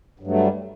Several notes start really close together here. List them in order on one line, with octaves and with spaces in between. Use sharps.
G2 F#3 A3 G3